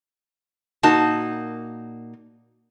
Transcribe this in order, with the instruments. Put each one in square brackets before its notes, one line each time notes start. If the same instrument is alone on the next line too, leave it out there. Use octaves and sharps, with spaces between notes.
[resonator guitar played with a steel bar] A#2 A#3 D#4 F#4 A5